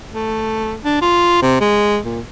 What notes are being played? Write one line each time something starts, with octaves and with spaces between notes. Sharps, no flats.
A3
D4
F4
C3
G#3
A#2